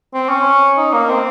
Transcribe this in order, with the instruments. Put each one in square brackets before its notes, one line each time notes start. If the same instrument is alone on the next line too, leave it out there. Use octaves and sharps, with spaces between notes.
[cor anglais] C4
C#4
D#4
A#3
C4